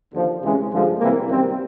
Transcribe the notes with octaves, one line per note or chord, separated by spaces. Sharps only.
D#2 D3 F3
C#2 C3 E3 G#3 C#4
G2 D3 F3 G#3
C2 C3 E3 G3 A#3
F#2 D#3 G3 C4